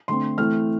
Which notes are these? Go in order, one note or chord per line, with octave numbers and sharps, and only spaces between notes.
D3 A3 C4 C6
E3 A3 C4 F6